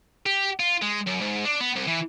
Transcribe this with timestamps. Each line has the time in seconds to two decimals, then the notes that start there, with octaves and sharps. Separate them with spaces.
0.26 G4
0.60 F4
0.82 G#3
1.07 F#2
1.21 G#2
1.45 D4
1.61 B3
1.76 C2
1.88 E3